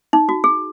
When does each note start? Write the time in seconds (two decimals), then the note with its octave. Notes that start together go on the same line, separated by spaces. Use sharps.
0.13 D#4
0.29 F#4
0.44 G#4